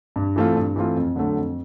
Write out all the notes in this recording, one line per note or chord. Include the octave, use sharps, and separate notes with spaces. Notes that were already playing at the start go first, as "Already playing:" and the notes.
G2
E3 A3 C4 F4
G2
E3 A3 C4 F4
F2
D3 F#3 A3
F2